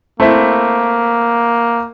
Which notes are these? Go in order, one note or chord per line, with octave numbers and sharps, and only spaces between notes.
A3 A#3 C4 E4